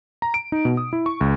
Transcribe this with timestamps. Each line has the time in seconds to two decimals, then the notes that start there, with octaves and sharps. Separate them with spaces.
0.22 A#5
0.34 D7
0.52 D#4
0.65 B2
0.77 D#6
0.93 E4
1.06 C#6
1.21 C#2